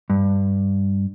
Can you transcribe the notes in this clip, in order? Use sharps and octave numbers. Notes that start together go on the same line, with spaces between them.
G2